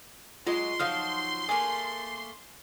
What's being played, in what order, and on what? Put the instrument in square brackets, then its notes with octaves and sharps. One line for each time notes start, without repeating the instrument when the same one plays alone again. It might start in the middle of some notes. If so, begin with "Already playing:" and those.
[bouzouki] F#3 G#3 D#5 [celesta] F4 [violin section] C6
[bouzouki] F3 F#3 D#4 [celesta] F5 D#6 F6
[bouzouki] A3 A#3 [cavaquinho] G#4